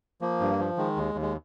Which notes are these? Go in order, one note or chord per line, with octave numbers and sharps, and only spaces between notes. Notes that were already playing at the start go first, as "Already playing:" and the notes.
F3 A#3
G2
F3
D#3 G#3
D#2
D#2
G#3